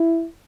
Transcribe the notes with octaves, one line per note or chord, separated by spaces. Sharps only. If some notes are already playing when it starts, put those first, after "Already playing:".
Already playing: E4